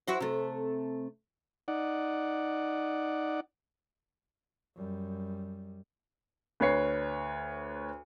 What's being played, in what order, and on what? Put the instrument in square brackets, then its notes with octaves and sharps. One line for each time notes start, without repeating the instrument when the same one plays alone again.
[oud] E4 F#4 C5
C3 A3
[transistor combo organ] D#4 D5 F#5
[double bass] F#2 G3
[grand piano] D2 B4 C#5 C7